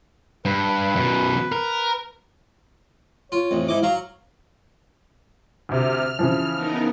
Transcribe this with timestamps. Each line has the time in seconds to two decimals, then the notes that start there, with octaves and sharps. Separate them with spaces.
0.45 G2 B4
0.96 F#2 B2
1.52 A#4
3.32 F4 C#5
3.51 A1 F2
3.68 G#2 E4 D#5 D6
3.83 F#3 F5 A#5 C#6
5.69 D2 C3 F6
6.19 C#3 E3 F3
6.56 B3 D#4 A#4